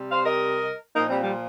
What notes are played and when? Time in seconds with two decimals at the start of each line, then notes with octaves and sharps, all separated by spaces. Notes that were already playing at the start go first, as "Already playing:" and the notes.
Already playing: C3 G3
0.12 C5 F5
0.26 A#4 D#5
0.95 A#2 F3 A#3 D#4
1.09 G3 C4
1.24 G3